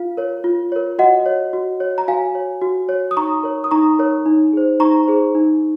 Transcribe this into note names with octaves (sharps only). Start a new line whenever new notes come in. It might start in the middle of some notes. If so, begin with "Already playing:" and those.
Already playing: F4 F5
A#4 C#5
F4
A#4 C#5
F#4 D#5 F#5
C#5
F#4
C#5
A#5
F#4 F5 G#5
C#5
F#4
C#5
D#6
D#4 A#5 C#6
A#4 C#5
D#6
D#4 A#5 C#6
A#4 C#5
D#4
G#4 C5
D#4 A#5 C#6
G#4 C5
D#4